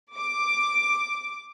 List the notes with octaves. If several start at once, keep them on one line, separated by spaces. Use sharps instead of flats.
D6